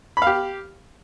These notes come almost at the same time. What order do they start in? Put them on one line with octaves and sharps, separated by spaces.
B5 F5 G4